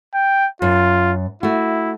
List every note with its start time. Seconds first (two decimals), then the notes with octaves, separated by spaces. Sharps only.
0.14 G5
0.62 F#2 F4
1.43 A3 E4 F#4